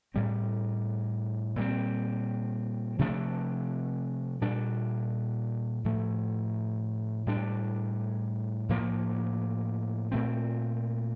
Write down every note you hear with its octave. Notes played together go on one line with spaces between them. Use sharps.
A2 G3 C4
A#2 G3 C4
C3 F3 A3 D4
A#2 G3 D4
A2 F3 A3
A2 G3 D4
A2 F3 A#3
A#2 A3 C4